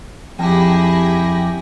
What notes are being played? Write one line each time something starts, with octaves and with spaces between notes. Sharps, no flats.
F2 E4 G4 G#4 G5 A5 A#6